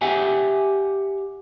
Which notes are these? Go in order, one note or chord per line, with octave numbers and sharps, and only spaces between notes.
G4 E5 F#5 G#5